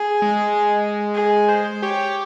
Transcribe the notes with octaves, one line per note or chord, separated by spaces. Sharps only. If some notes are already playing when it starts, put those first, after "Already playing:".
Already playing: G#4
G#3
G#4
C5
G4 C#5